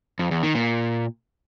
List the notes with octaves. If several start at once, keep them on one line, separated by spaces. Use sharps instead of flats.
F2
E2
D#3
A#2